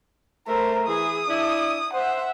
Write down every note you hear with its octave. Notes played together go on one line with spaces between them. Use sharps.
A3 A#4 C5
E3 E4 G#4 D#6
D4 E4
C5 E5 F#5